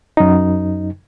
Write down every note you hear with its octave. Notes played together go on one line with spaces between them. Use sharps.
F#2 D#4